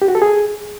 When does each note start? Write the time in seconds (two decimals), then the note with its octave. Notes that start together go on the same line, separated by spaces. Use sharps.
0.02 G4
0.08 F#4
0.15 A4
0.22 G#4